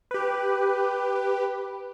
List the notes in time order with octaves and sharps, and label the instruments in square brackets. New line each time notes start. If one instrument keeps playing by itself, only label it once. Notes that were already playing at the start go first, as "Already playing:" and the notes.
[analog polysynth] G4 B4